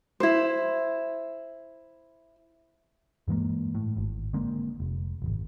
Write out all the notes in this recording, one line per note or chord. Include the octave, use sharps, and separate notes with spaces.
E4 C5
G2 E3 G#3 A#3
A2
G#1
D3 G#3 A#3 C4
F1
D#1 G#1